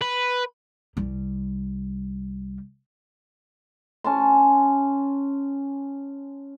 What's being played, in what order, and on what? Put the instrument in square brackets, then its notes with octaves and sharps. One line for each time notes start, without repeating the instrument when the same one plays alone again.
[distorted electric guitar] B4
[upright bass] C2 G3
[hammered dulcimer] C#4 A5 C6